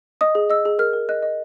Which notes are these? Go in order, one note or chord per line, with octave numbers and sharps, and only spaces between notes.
D#5 D#6
G#4
D#5 E6
G#4
A#4 F6
A#4
D#5 F#6
D#5